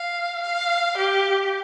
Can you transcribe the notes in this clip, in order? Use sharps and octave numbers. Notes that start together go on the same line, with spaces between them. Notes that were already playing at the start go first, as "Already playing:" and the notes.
Already playing: F5
F5
G4